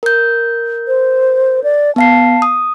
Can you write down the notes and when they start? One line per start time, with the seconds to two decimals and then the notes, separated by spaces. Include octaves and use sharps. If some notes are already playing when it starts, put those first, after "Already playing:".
0.03 A#4 G6
0.88 C5
1.64 D5
1.96 B3 F5 A5 C7
2.42 D#6